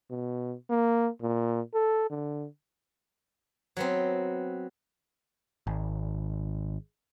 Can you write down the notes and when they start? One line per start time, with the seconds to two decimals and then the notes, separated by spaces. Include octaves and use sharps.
0.11 B2
0.70 A#3
1.22 A#2
1.74 A4
2.10 D3
3.77 F#3 B3 C4
5.67 G#1